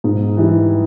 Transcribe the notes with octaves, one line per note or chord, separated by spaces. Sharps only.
G#2
E3 G3